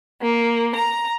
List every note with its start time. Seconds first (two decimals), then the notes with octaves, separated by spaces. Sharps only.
0.22 A#3
0.75 A#5